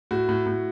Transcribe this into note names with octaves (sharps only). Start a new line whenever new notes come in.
A2 F#4
A2
A2